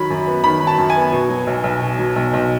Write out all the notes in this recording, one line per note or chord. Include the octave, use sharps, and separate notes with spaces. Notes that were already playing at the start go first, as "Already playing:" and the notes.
Already playing: D#3 F#3 B5
F#2
B3
D#3 B5
F#3
A5
F#2
G#5
B3
B2
F#3
B1
B1
B2
F#3
B1
B1